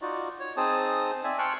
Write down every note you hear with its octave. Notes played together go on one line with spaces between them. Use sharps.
D#4 F4 F#4 D5
C#5
C4 D#4 G#4 C5 A5 D#6
C4 D5 E5 G#5
G5 A5 C6 C#6 F6 F#6